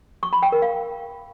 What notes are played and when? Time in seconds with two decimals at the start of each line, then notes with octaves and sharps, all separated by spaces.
0.23 C#6
0.33 B5
0.42 G5
0.52 A#4
0.62 F5